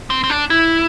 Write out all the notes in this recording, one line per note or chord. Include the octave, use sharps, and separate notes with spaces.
C4
C4
D4
E4